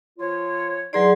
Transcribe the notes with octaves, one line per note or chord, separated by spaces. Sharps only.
F3 F4 C#5
E3 F#3 D#4 G#4 D5 C6